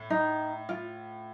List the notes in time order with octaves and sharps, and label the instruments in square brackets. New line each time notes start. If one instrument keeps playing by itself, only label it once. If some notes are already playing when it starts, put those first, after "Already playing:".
Already playing: [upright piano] A2
[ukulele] D#4
F4